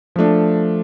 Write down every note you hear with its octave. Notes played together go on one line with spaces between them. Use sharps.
F3 A3 D4